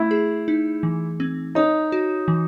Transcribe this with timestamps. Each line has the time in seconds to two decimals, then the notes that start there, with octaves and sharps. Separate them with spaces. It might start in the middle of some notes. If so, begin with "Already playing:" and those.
Already playing: A3 E4
0.11 G#4
0.48 D#4
0.83 E3
1.20 C4
1.55 D#4 C#5
1.92 F#4
2.28 E3